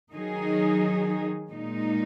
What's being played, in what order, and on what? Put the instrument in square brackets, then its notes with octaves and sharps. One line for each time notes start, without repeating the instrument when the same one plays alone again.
[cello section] D#3 F#3 D#4 G#4
A#2 G#3 D#4